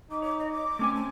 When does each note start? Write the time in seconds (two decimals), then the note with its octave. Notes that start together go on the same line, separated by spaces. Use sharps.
0.11 D#4 D6
0.22 C#5 D6
0.40 D#5
0.52 D6
0.79 A3 C4 C#4 G#5
0.95 A5